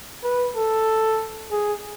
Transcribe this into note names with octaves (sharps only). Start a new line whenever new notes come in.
B4
A4
G#4